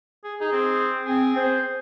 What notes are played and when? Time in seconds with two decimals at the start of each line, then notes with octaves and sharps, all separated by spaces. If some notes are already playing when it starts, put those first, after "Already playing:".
0.24 G#4
0.41 D#4 G#4
0.52 C4
1.06 C4 G#4
1.36 C5